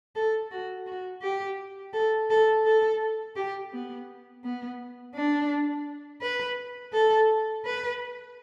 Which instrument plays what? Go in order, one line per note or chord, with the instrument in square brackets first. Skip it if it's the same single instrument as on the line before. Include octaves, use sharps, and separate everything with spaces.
[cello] A4
F#4
F#4
G4
A4
A4
A4
G4
B3
B3
D4
B4
A4
B4